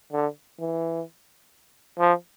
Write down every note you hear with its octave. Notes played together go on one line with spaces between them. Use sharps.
D3
E3
F3